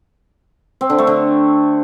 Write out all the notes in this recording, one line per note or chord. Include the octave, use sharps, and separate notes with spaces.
C4
D3
A3
D3